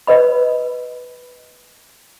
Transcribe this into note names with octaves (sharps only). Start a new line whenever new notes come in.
B4 D#5 B5